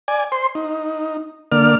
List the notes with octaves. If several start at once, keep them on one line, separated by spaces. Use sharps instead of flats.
D5 G#5
C5 C6
D#4
D3 A#3 D5 F6